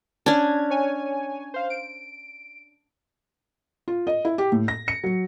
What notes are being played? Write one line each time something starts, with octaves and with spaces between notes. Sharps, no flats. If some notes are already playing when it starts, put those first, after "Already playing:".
C#4 D4 G#6
C#5 G#5
C5 F5
D7
F4
D#5
E4
G4
A2
A#6
C#7
F#3